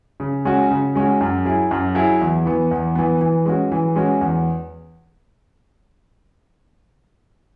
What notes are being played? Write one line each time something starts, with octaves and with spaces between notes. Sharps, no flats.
C#3
G#3 C#4 F#4
C#3
G#3 C#4 F#4
F#2
F#3 E4 G#4
F#2
F#3 E4 G#4
E2
E3 B3
E2
E3 B3
E3
G#3 C#4 F#4
E3
G#3 C#4 F#4
E2